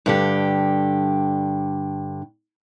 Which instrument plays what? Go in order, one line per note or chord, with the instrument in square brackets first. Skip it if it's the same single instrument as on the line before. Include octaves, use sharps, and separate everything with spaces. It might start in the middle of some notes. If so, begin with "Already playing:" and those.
[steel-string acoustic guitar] G2 D3 G4